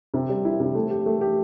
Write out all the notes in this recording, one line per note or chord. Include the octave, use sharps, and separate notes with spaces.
C3
G3
E4
C3
A3
G4
A3
G4